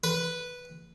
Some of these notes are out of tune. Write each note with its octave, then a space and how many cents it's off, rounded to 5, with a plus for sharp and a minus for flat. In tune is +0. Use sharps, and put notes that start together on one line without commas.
B4 -5